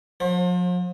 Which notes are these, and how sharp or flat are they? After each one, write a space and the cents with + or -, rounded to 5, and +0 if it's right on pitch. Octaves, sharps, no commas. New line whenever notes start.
F3 +45 C5 +35